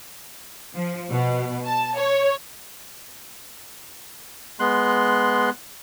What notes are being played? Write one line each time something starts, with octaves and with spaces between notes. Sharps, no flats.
F3
B2
A5
C#5
G#3 B3 C6 F#6